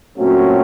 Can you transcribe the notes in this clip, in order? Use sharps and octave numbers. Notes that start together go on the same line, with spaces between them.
A#2 F#3 A3 C4 C#4 F#4